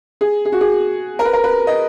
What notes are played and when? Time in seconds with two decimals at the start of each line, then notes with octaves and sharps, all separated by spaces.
0.21 G#4
0.45 G#4
0.52 F#4
0.61 G#4
1.19 A#4
1.25 B4
1.33 A#4
1.44 B4
1.67 D#5